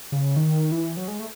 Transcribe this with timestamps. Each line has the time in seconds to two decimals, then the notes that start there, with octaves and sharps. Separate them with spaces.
0.12 C#3
0.36 D#3
0.72 E3
0.97 F#3
1.08 G#3
1.19 A3